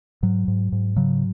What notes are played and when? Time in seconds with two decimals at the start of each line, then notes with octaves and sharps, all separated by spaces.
0.23 G#2 F#3
0.48 G#2
0.72 G#2
0.96 C#3 F#3